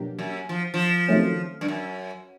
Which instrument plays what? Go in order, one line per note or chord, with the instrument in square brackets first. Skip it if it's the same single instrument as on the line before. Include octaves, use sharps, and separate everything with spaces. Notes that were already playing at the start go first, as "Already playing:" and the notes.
Already playing: [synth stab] B2 F#3 A#3 D4 G4
[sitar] F#2
F3
F3
[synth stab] C3 D#3 F#3 A3 C#4
[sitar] G2
F#2